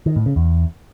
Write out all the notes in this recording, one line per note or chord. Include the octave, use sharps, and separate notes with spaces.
D#3
A2
C#3
E2